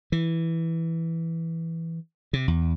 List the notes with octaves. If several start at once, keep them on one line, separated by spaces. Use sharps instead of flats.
E3
C3
E2